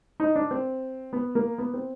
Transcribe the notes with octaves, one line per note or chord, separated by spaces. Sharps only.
D#4
D4
C4
B3
A#3
B3
C4